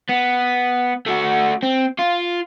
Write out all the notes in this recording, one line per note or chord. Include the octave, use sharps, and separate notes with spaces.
B3
A3 F#4
C4
F4